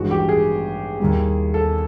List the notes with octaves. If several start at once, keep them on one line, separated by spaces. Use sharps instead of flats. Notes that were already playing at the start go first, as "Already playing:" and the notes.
Already playing: A1 G2 D#3 G#3 F#4
G4
G#4
D#2 D#3 G3
A4